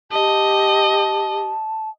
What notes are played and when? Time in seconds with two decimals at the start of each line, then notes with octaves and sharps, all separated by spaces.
0.12 G4 D#5 A5